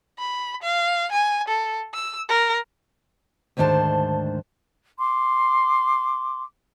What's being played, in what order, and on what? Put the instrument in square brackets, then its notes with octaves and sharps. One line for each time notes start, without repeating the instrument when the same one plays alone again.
[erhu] B5
F5
G#5
A4
E6
A#4
[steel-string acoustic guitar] D2 G#2 D#3 D4 C5 A5
[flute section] C6 D6